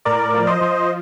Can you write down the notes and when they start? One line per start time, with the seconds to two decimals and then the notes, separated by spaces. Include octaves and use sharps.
0.05 A2 A#4 D5
0.34 F3
0.47 C5 D#5
0.61 F3